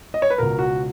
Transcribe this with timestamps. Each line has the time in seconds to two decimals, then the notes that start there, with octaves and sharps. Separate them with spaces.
0.14 D#5
0.22 C#5
0.30 B4
0.38 C#2 B2 A#4
0.59 F#4